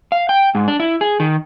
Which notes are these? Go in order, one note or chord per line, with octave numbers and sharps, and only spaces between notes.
F5
G5
G#2
D4
E4
G#4
D#3